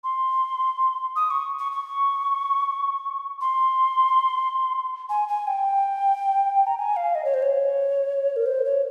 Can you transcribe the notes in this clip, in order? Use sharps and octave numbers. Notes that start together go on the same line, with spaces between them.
C6
D#6
C#6
C#6
C#6
C6
G#5
G#5
G5
A#5
G#5
F5
D#5
C#5
C5
C#5
A#4
C5
C#5